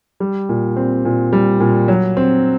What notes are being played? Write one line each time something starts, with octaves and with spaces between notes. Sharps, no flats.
G3
A#2
C4
A#2
G3
A#2
F#3
C4